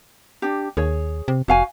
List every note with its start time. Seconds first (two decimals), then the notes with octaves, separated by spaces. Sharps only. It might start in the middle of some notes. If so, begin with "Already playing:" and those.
0.42 D4 G4
0.77 D#2 G#4 C#5
1.28 C3
1.48 F1 F#4 F5 G#5